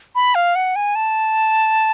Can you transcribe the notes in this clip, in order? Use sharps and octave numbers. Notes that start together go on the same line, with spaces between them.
B5
F5
F#5
G#5
A5